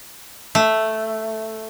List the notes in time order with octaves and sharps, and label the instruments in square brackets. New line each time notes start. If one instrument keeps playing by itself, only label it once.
[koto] A3